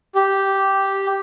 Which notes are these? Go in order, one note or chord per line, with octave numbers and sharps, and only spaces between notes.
G4